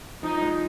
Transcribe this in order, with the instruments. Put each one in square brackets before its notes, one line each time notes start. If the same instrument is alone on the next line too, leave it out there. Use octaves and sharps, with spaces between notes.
[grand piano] F3 [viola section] D#4
[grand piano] G#3